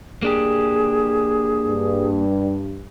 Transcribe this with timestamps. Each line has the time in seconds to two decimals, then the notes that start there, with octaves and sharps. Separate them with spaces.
0.22 A#3 D4 G4 G#4
1.66 G2